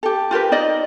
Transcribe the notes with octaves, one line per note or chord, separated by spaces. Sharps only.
G4 A4
F4 G4 A#4 B4
D#4 D5 D#5